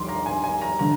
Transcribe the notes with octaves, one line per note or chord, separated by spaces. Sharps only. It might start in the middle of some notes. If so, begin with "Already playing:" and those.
Already playing: F1 D#2 D#3 G3 C6 D6
A#5
G#5
G#5
A#5
D3 A#5